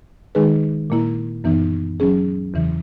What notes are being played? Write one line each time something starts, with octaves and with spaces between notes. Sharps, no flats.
D#3 G#3 D#4 G#4 B4
A#2 A#3 E4
F#2 E3 B3 D#4
F#3 C#4 G#4
E2 C#3 E3